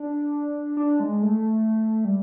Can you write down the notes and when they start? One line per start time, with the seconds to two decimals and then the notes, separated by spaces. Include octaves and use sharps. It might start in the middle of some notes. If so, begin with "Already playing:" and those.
Already playing: D4
0.77 D4
1.00 G#3
1.23 A3
2.05 G3